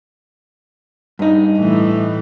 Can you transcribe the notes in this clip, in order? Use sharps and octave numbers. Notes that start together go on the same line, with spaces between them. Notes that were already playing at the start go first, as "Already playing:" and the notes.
G2 D#4
A2 E3